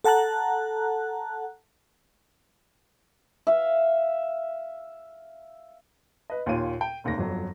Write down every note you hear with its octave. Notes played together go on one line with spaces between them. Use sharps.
A4 F#5 A5 A#5 F#6
E5 F5
B4 D#5
D#2 A#2 F4 C#5 D#7
G5
F1 D#2 C3 A#6
G1 F2 F#3